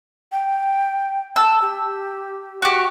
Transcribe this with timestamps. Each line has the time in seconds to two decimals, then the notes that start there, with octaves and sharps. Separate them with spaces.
0.32 G5
1.36 A5 E6
1.62 G4
2.62 F#4 G4 C#6